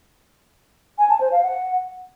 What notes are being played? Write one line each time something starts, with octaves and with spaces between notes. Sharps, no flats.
G#5
A5
C5
F5
F#5